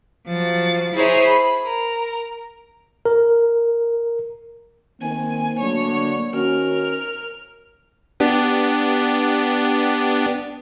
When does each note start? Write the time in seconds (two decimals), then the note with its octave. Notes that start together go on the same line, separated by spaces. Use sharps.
0.27 F3 F#3 A6
0.93 E4 G#4 C5 C#5 E5 A#5
1.25 B5
1.63 A#4
3.05 A#4
5.01 D#3 A#3 C4 G#5
5.59 D3 F#3 A3 C#5
6.33 D#3 C#4 F#4 A#4 F6
8.20 B3 D4 G4